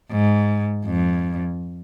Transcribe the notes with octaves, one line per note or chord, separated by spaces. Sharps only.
G#2
F2